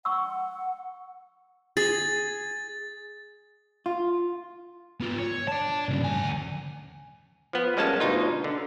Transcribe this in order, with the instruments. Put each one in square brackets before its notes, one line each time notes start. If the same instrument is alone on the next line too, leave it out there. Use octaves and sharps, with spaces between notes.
[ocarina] F#5 [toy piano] C#6 E6
[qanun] G#4 [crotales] A6
[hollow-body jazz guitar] F4
[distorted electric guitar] B3 F4
C#5
D5 A5
G2 C#3
D2 G#5
[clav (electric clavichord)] F3 B3
G3 G#3 A#3 C#4 A5
D2 B2 D#4 F4
D3